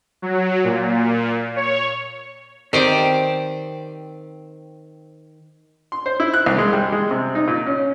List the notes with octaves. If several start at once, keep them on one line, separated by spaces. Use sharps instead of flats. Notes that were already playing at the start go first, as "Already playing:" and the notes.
F#3
A#2
C#5
D#3 C4 G4 C5 D5
C6
C5
E4
F#6
C2
G#3
G3
G#3
C3
D#4
A#2
C#4